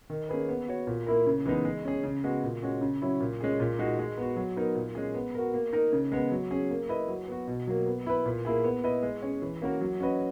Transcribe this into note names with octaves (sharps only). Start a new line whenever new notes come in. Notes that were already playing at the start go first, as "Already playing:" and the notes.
D#3
A#3 C#4 G#4 B4
B3
F#4 C#5
A#2
A#3 E4 A#4
C#3
E3 G#3 B3 D#4
G#3
C#4 G#4
C#3
G#3 B3 F#4
A#2
G#3 C#4 F#4
C#3
F#3 C#4 E4
A#2
G#3 C#4 G#4
A#2
G#3 D#4 F#4
G#3
B3 F#4
F#3
B3 D#4 A#4
A#2
G#3 C#4 G#4
B3
F#4 A#4
A#3
D#4 A#4
C#3
G#3 B3
F#3
C#4 G#4
A#3
E4 B4 D#5
F#3
B3 F#4
B2
F#3 A#3
B3
E4 B4
A#2
A#3 E4 G#4
B3
E4 B4 D#5
G#3
C#4 G#4 C#5
E3
A#3 C#4 F#4 A#4
F#3
C#4 F#4 B4 D#5